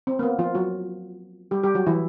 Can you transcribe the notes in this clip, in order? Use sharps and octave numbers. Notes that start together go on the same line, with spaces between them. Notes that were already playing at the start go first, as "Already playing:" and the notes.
C4
A#3
B3
F3 F4
F#3 F#4
G3 G4
G3 G4
F#3 F#4
E3 E4